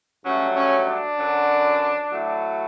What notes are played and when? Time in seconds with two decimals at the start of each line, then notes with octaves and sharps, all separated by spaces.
0.24 G2 F#3 A3 C#4
0.55 C#4
0.86 D4
1.17 F#2 D3 F#3
2.09 A2 F#3 A3